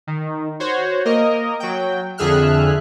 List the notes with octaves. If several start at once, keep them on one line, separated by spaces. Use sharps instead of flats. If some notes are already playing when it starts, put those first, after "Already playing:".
D#3
F#4 C5 C#5
A#3 A#4 D#5
F#3 G5
F2 D3 G#4 E5 F6 F#6